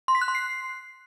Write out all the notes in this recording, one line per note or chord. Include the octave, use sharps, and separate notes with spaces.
C6
B6
F#6
C6
C7